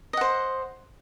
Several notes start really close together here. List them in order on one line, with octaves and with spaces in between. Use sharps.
D#5 F#5 C5